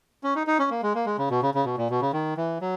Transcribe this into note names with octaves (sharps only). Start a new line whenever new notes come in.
C#4
D#4
D#4
C#4
A#3
G#3
A#3
G#3
C#3
B2
C#3
C#3
B2
A#2
B2
C#3
D#3
E3
F#3